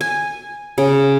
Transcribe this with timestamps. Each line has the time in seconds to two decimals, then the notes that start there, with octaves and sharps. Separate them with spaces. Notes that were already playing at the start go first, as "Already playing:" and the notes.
0.01 G#5
0.78 C#3